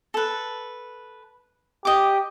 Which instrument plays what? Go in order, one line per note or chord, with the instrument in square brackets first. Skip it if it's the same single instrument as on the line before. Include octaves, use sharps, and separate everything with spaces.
[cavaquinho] A4 B4
[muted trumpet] G4 [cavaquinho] D#5 D6